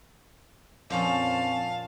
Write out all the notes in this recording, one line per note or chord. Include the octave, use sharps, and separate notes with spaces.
F2 A#2 F3 C#4 F5 A5